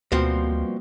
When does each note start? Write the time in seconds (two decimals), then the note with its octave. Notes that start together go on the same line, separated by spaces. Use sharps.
0.12 D2 B2 F3 G3 A#3 C4